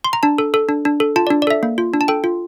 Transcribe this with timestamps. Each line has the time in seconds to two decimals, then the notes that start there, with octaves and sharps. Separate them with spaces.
0.04 C6
0.13 A#5
0.23 D4 A5
0.38 A4
0.54 A4
0.69 D4
0.85 D4
1.00 A4
1.16 F4 A5
1.27 D5
1.31 D4
1.42 D5
1.47 A4 E5
1.63 A#3
1.78 F4
1.94 D4
2.01 A5
2.08 A4 G5
2.24 F4